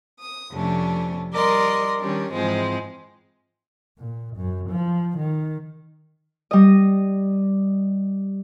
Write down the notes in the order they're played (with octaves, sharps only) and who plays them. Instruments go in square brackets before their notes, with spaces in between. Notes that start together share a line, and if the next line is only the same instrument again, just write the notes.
[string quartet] D#6
F2 C3 A3 C#4 D4
G3 A#4 D5 D#5 C6
D#3 G3 C#4 D4
G#2 E3 F3 G#3 C4
[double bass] A#2
F#2
F3
D#3
[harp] G3 D#5